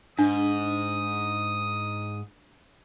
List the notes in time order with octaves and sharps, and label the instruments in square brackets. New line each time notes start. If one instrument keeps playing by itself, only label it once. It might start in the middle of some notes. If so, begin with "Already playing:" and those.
[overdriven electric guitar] G#2 [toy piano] D4 [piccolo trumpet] D#6